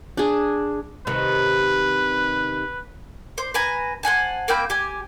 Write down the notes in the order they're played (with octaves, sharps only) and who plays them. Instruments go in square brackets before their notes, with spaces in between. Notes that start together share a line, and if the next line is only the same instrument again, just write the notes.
[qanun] D4 G#4
[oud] C3 D#3 [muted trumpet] B4
[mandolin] C5
B4 G#5 A#5
C5 F#5 G#5 A5
A#3 C4 G5 B5
G4 G#5